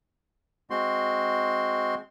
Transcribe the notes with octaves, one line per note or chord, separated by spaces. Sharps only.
G#3 C4 F#4 C6